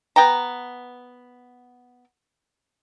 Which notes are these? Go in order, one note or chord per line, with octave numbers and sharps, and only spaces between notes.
B3 G5 A#5